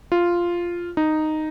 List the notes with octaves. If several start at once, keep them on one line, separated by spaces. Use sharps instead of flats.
F4
D#4